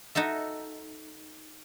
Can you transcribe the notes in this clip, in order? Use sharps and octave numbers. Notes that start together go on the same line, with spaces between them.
D#4 F#4 A4 E5